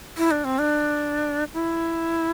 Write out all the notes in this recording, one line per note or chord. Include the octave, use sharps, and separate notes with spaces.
E4
D4
C4
D4
E4